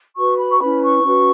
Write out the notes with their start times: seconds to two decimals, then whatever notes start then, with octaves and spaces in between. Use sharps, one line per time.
0.16 F#4 B4 C#6
0.38 B5
0.50 C#6
0.60 C#4 E4 B4 B5
0.82 C#6
1.04 C#4 F#4 B4